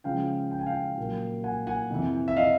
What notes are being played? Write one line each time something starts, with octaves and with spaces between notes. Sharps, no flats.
C#3 F3 G#3 C#4 F5 G5
G5
G#5
F5 G5
A#2 F#3 A#3
F#5 G#5
F#5 G#5
F2 C3 E3
E5
D#5 F5